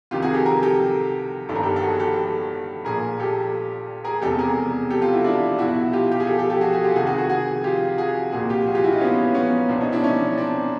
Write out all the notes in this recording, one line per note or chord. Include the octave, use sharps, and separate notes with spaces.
C2 C3 D#3 F4 G4
F#4 G#4
G4 A4
G#4 A#4
G4 A4
G1 G2 D#3 A4
A#4
G4 A4
A4
F#4 G#4
G4 A4
A#1 A#2 G#4 A#4
G4 A4
G#4 A#4
E1 E2 C3 G4 A4
G#4 A#4
G4 A4
F4 G4
E4 F#4
D4 E4
B1 B2 E4 F#4
F4 G4
G4
G#4
G4 A4
G4 A4
G4 A4
F#4 G#4
F#4 G#4
F4 G4
A4
C2 C3 D#3 F#4 G#4
F#4 G#4
F#4 G#4
F#4 G#4
F4 G4
F#4 G#4
C2 A#2 F#4 G#4
F4 G4
F#4 G#4
F4 G4
E4 F#4
D#4 F4
B3 C#4
B3 C#4
C2 B2 C4 D4
C#4 D#4
D4 E4
C#4 D#4
C4 D4